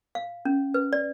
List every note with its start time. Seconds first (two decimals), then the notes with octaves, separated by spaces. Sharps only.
0.15 F5
0.45 C#4
0.74 B4
0.93 D5